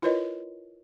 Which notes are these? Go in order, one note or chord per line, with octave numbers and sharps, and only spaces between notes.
E4 F4 A#4 B4 C#5 D#5